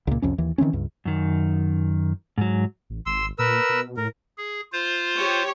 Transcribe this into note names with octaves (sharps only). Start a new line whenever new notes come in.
C#2 A#2
C2 F2 C#4
D#2 E3
D#3 E3 C4 C#4
C#2 G2
F#2 D#3
G#2 F#3
A1
G#1 C6 E6
A#2 A#4 B4 E6
B2
A2 A#4
G#4
F4 C5
G4 C#5